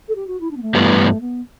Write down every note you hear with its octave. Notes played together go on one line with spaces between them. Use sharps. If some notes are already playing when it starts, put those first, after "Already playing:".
A4
G4
F#4
E4
D4
B3
A3
G2 E3 G3 B3
B3